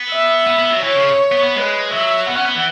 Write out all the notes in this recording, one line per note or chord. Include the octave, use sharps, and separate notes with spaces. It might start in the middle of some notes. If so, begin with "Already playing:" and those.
Already playing: B3
E5
B3
B3
F#3
E3 C#5
C#3
B3
B3
G#3 B4
F#3 E5
B3 F#5
C#4
B3
E3